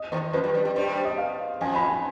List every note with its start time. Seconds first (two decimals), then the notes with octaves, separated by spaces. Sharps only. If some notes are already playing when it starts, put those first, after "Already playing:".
Already playing: D#5
0.12 D#2 D#3 C5
0.33 F2 F3 B4
0.44 G2 G3
0.54 G2 G3
0.65 G2 G3
0.76 G2 G3 C5
1.05 D#5
1.18 F5
1.61 F2 F3 G#5
1.75 B5
1.90 G#5